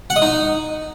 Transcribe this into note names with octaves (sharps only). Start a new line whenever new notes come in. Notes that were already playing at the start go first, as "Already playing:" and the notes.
F#5
D#5
D#4